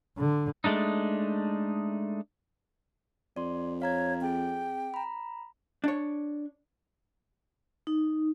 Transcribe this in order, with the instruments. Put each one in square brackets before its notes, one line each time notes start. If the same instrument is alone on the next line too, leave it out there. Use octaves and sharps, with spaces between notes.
[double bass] D3
[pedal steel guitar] G#3 A3 D4 D#4
[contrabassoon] F2 [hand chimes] D5 C6
[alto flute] C#5 [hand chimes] F5 A#5 G#6
[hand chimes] C4 G#4 [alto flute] G5
[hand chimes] A#5 B5
[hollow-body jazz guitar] D4 C#5
[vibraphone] D#4